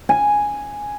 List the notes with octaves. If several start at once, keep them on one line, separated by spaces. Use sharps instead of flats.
G#5